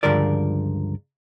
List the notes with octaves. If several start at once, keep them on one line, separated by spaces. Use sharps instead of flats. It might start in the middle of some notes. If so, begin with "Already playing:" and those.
C#2 G2 D3 F3 A#4 D5